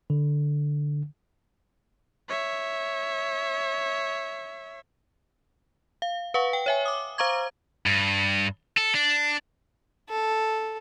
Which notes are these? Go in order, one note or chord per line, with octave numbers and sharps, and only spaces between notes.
D3
C#5 E5
F5
B4 F5 F#5 C#6
G5
C#5 E5 G#5
D6 D#6
C5 F5 A#5 C#6 D6 G#6
G2
A4
D4
A4